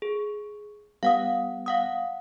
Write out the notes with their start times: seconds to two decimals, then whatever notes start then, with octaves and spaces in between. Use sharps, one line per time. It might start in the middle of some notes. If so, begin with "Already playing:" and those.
0.02 G#4
1.03 G3 B3 F5 F#5 D#6
1.66 F5 F#5 D#6